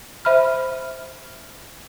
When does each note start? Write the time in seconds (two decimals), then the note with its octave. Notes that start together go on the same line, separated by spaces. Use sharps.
0.25 C5 E5 B5 F6